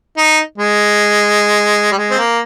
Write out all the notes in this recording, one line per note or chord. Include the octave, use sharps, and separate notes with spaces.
D#4
G#3
G3
G#3
C4
A#3